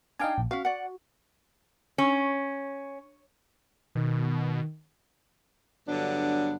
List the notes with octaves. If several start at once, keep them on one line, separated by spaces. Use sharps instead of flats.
D4 D#4 F5 G5 G#5
A#1
C#4 F#4 F5
D5 F#5
C#4
B2 D#3
G2 D3 F#3 B3 D4